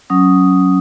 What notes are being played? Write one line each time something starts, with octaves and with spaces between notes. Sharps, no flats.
F#3 C#4 D#6